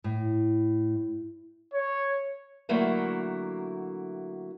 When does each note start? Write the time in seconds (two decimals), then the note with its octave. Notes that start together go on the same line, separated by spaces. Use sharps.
0.04 A2
1.73 C#5
2.69 D3 F#3 A3 A#3 E4